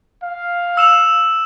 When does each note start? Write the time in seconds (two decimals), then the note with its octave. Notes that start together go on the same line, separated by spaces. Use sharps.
0.23 F5
0.77 E6 E7 F7